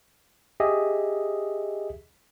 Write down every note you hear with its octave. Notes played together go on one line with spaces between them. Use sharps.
G4 G#4 D#5 E5